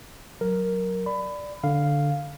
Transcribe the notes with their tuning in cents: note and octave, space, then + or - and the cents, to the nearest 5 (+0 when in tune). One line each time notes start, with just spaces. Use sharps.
F#3 +0 A#4 +0
D5 +0 B5 +20
D3 +0 F5 +0